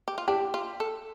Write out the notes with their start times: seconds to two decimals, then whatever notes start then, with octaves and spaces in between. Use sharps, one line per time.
0.08 G4
0.18 F4
0.28 D4 G4
0.54 F4
0.80 A4